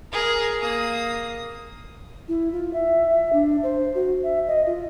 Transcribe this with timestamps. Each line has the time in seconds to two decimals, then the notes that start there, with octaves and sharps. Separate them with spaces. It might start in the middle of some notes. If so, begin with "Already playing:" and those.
0.11 G#4 A#4
0.59 A#3 D#6
2.28 E4
2.52 F4
2.73 E5
3.10 E5
3.33 D4
3.63 C5
3.95 F#4
4.23 E5
4.47 D#5
4.67 F4